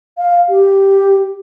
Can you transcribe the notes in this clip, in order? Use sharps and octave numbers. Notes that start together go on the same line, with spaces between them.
F5
G4